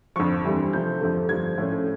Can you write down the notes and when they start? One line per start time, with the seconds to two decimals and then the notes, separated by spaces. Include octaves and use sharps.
0.16 F2 D3 F3 C#6
0.44 G2 E3 G3 C4
0.73 C3 F3 A3 C4 G6
1.01 F2 D3 F3 A3
1.29 G2 D3 F3 G#6
1.58 A2 F3 A3 C#4